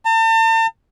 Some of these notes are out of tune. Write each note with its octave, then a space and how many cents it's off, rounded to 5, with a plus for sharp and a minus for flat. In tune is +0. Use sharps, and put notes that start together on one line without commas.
A5 +40